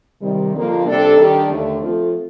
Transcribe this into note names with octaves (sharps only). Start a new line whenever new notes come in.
C3 D#3 G3
F2 D3 F3 A#3 F4
C3 G3 D4 A4
D#3 G3 D4 G4
D#2 D3 A3
F3 A3 C4 F4 A4